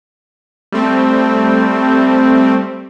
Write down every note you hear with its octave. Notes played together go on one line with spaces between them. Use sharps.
G3 A3 C4